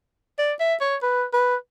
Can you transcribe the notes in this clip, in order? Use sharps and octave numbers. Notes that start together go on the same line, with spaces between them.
D5
E5
C#5
B4
B4